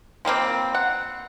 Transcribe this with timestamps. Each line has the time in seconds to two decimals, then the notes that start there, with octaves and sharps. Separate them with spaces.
0.25 F3 G3 A#3 C4
0.75 F#5